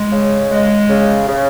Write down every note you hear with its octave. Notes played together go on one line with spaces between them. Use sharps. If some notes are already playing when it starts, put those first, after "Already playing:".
Already playing: G#3
C#3
G#3
C#3
C#3